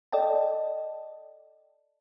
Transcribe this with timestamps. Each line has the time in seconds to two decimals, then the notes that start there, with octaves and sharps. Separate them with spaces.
0.12 A4 D5 D#5 G5 A5